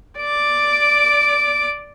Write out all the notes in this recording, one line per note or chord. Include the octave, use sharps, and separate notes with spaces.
D5 D6